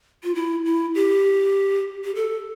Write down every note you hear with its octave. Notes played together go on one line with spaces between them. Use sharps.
F4
E4
E4
G4
G4
A4